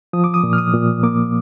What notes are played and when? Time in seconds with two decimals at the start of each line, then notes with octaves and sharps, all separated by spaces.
0.13 F3 D#6
0.24 D6
0.34 D#6
0.43 A#2
0.53 F6
0.58 D#6
0.73 A#2
1.03 A#3 D6